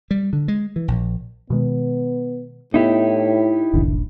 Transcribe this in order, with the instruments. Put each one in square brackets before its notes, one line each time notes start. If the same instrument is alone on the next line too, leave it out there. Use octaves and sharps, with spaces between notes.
[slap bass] G3
D3
G#3
E3
A#1
[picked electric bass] B2 D#3 G#3 [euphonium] B3
[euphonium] A2 [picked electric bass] B3 [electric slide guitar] D#4 E4 G4
[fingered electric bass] D#1 A#1 D4 [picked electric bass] G2 D3 E3